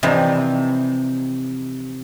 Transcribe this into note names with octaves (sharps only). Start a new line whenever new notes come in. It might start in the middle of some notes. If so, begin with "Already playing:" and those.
C3 E3 F3 D#4